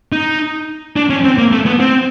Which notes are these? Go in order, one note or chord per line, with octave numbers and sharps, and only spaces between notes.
D#4
D4
C#4
C4
A#3
A3
B3
C4